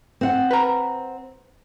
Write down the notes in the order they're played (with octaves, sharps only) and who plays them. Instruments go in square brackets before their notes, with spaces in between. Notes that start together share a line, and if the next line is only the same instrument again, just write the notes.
[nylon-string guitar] C4 F#5
[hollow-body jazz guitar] B4 A#5